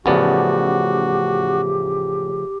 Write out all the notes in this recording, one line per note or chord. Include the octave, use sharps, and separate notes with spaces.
A1 C#3 F3 A3 B3 F#4 G4 D5